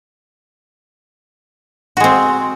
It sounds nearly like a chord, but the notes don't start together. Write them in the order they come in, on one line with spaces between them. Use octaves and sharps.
F#4 G#3 C4